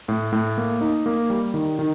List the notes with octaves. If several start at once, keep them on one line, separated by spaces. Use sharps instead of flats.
A2
A2
A#3
D#4
A#3
G3
D#3
D#3